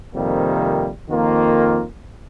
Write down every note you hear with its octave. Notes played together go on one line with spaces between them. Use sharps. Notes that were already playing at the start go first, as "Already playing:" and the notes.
F2 C3 D#3 G3 A#3
F2 D#3 A#3 F4